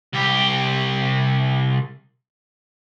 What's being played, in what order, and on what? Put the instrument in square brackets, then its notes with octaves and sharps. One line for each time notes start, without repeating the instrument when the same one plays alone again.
[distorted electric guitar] C2 G4